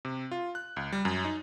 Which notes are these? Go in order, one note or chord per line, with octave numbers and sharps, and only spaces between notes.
C3
F4
F#6
C#2
G3
F#2
D#4